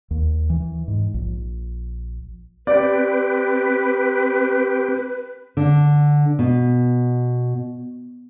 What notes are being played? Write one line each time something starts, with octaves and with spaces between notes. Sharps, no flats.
D#2
E3
G#2
A#1
C4 G4 B4 D5
D3
B2